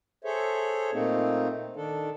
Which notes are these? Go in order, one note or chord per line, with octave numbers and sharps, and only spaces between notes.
G#4 A4 C5 C#5 E5
A#2 A3 A#3 C4 D#4
D#3 D4 A4